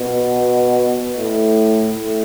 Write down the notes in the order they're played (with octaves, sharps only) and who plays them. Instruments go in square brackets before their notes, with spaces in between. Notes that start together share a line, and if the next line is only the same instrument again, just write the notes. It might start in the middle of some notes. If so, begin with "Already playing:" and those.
Already playing: [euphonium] B2
A2
A2